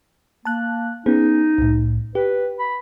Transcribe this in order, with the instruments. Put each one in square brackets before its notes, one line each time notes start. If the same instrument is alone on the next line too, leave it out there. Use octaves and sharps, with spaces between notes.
[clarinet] A#3 [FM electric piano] A5 F#6
[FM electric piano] B3 C#4 G#4 [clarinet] D#4
[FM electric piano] C2 A2
[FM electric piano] G4 [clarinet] B4
[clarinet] B5